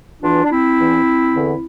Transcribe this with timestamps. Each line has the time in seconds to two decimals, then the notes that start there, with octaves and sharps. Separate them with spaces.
0.22 E2 E3 D4 F4
0.44 D4
0.50 C4 E4
0.78 E2 E3
1.33 E2 D3